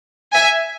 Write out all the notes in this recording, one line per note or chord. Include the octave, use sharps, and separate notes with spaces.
E5 G#5